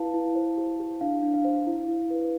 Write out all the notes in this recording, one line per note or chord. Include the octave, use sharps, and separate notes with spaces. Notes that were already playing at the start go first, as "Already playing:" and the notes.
Already playing: E4 B4 F5 A5
E4
C5
G4
G4
D4 F5
D4
F5
C5
E4
E4
B4